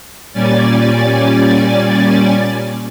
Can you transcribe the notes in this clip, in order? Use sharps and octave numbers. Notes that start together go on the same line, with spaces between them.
A#2 G3 C#4 D5 G#5 A6